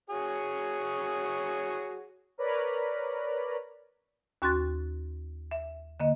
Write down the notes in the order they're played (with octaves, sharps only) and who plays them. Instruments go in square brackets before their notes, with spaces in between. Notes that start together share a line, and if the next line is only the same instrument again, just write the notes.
[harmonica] F#4 G#4 C#5
[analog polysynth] A#4 B4 C#5 D5 A#5 B5
[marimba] D#2 C#4 F#4 C6 F#6 A6
E5
D3 A#3 D#5